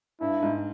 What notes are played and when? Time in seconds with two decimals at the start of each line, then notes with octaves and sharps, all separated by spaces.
0.21 G2 E4
0.42 G#2